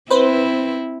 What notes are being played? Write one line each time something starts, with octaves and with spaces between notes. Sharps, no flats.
C4 E4 B4 C5